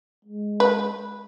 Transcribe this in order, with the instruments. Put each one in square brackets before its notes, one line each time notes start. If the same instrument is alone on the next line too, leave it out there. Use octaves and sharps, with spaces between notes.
[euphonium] G#3
[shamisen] B4